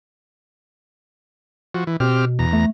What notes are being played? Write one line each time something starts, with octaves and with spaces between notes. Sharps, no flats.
F3 F#4
E3
B2 C4 G4 F6
E2 A#5
A3